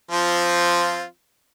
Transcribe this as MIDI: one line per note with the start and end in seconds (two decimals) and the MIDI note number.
0.11 1.03 53
0.11 1.03 60
0.11 1.03 65